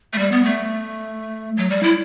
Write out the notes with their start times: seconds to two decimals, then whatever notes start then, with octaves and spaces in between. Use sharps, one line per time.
0.13 A3
0.18 G3
0.31 B3
0.44 A3
1.57 F#3
1.70 G3
1.83 E4